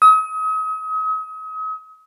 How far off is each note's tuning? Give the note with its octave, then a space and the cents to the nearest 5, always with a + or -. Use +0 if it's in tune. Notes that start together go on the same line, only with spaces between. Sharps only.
D#6 +40